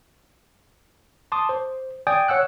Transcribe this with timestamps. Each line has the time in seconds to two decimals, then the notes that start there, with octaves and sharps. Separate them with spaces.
1.32 A5 C6 D6 D#6
1.49 C5
2.07 D5 G5 G#5 D#6
2.28 C#5 F#5 E6 F#6